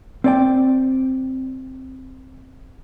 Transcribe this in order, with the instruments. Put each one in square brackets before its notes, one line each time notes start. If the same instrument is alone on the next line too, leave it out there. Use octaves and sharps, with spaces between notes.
[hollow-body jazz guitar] C4 D5 G5